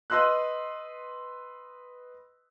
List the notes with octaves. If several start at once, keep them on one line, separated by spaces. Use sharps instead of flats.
B4 D#5 C6 E6 F#6